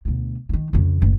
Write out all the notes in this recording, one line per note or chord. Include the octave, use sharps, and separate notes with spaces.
D2 B2
D#3 E3
F2 C#3
F#1 A2